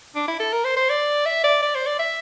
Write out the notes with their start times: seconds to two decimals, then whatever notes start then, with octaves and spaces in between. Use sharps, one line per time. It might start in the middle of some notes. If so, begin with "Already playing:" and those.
0.16 D4
0.28 E4
0.40 A4
0.53 A#4
0.65 C5
0.77 C5
0.90 D5
1.26 E5
1.44 D5
1.62 D5
1.75 C5
1.87 D5
1.99 E5